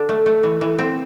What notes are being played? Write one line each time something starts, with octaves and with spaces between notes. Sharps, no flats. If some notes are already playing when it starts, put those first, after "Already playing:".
Already playing: D3 D4
A3
A3
E3
E3
C4